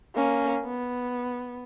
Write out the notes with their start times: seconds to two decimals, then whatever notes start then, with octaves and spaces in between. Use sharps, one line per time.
0.15 A#3 C#4
0.65 B3